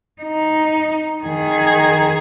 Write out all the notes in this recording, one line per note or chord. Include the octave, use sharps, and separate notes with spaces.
D#4
D#3 G#4